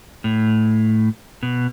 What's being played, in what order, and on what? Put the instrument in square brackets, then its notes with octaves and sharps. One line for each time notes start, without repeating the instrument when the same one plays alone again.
[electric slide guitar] A2
B2